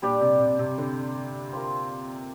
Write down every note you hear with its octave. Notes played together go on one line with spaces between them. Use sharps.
A#2 G3 D4 G4 D5
C3
C3
C3
D3
C4 F4 A#4